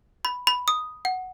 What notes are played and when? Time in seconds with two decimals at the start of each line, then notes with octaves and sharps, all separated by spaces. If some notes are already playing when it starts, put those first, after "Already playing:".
0.25 B5
0.47 B5
0.68 D#6
1.05 F#5